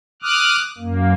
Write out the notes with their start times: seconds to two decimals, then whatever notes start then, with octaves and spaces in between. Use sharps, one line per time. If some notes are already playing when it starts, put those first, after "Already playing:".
0.22 D6 D#6 F6 F#6
0.78 F#2 A#3